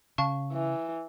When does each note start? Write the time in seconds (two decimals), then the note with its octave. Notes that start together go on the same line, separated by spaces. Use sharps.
0.18 C#3 F5 A5 C#6
0.52 E3